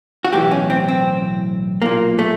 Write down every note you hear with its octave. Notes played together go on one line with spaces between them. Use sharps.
F#4
B1 A2 E3 G4
C#4
C4
C4
B1 A#2 A#3
A3